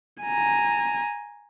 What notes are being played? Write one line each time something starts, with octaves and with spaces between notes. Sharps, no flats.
G#5 A#5